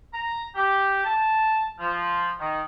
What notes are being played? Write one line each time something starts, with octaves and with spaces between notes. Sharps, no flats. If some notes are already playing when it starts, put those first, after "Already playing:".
A#5
G4
A5
F3
D#3